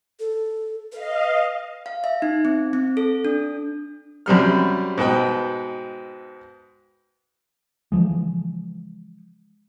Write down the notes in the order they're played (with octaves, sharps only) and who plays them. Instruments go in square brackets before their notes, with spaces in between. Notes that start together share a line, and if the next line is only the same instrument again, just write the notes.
[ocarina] A4
[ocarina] B4 [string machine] D#5 F5
[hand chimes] F5
E5
D#4
C4
C4
A4
D4
[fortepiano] F#2 C3 G3 F6
G#2 B2 B4 G5
[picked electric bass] C#3 E3 F3 G#3